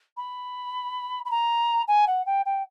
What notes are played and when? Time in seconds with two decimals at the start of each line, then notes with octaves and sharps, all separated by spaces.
0.17 B5
1.25 B5
1.31 A#5
1.88 G#5
2.07 F#5
2.26 G5
2.46 G5